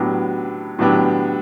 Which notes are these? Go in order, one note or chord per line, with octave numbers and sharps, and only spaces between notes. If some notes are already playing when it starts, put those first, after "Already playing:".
Already playing: A2 F#3 B3 D4 G4
A2 F#3 B3 D4 G4